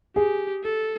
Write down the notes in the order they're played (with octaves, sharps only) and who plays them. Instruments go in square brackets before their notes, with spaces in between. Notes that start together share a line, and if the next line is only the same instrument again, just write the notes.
[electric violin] G4 [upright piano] G#4
[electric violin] A4